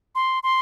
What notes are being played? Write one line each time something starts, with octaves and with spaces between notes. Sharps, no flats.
C6
C6